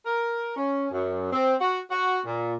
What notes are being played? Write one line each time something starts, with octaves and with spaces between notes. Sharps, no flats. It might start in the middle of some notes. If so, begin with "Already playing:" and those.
A#4
C#4
F#2
C4
F#4
F#4
A#2